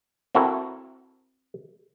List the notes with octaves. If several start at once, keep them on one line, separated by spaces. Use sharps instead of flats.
C4 E4 F#4 A4 A#4